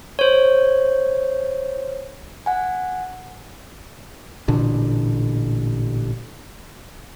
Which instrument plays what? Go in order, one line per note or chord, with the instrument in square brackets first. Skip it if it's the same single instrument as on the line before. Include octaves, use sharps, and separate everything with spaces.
[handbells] C5 C#5
[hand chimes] F#5 G#5
[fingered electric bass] A1 A#2 D3 D4